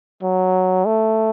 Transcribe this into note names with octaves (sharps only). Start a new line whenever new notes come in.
F#3
A3